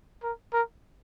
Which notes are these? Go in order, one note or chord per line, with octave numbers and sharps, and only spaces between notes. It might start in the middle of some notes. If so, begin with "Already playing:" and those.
A#4
A#4